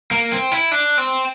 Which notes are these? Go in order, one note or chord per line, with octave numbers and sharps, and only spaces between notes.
A#3
C4
E4
D4
C4